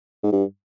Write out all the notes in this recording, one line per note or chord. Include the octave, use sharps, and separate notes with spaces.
G#2
G2